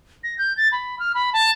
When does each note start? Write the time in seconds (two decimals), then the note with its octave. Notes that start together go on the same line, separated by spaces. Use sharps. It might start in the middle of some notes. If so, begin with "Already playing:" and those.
0.24 A#6
0.38 G6
0.57 A6
0.72 B5
0.99 F6
1.14 B5
1.33 A5